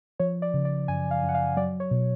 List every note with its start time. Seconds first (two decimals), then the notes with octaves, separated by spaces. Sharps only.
0.19 F3 C#5
0.42 D5
0.54 C#3
0.65 D5
0.88 F#2 G#5
1.11 F5
1.23 F#2
1.29 F#5
1.34 F5
1.57 F#3 D5
1.80 C#5
1.91 B2